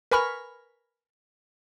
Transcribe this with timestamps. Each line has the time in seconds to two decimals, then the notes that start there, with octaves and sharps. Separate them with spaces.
0.11 A#4 B4 G#5 B5 C#6 F6